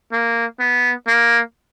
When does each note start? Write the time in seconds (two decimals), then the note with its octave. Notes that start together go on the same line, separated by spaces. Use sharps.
0.12 A#3
0.60 B3
1.08 A#3